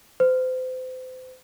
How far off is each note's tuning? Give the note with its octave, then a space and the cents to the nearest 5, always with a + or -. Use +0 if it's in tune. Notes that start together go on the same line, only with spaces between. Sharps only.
C5 -35